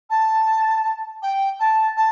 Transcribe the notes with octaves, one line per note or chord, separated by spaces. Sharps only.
A5
G5
A5
A5